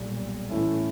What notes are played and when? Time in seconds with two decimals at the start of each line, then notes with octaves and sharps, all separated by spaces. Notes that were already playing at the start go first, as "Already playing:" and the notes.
Already playing: B1 A#2 G3
0.50 A2 E3 A3 C#4 E4